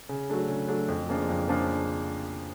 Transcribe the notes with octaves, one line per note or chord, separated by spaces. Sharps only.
C#3
F#3 A3 D4
C#3
F#3 A3 D4
F2
C#3 F3 A#3 D4
F2
C#3 F3 A#3 D4